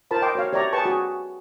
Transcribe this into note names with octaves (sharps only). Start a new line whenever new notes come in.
F4 A#4 C5 A5 B5
D#5 G5 C6 D6
F#4 C#5 F5
G4 C#5 D5 E5 A#5
G#4 B4 G5 A5 C#6
F#4 G#4